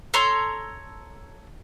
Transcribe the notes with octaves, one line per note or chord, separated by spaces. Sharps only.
A4 C#5 A#5 C6